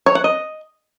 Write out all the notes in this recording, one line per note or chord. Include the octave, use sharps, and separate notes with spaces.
C#5
F#5
D#5